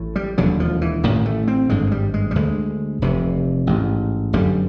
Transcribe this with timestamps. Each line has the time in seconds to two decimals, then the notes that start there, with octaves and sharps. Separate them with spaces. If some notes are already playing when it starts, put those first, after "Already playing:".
Already playing: A1 A2
0.16 G3
0.38 E1 D#2 D3 F#3
0.60 F3
0.82 E3
1.03 A1 A2 D#3
1.26 A3
1.48 C4
1.69 G#1 G2 D3 G#3
1.92 G3
2.14 G#3
2.31 G3
2.35 D2 D3 G#3
3.02 F1 E2 C3
3.67 A1 G#2
4.33 G1 F#2 D3 G3